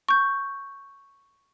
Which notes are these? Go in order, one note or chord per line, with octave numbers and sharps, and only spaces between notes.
C#6 G6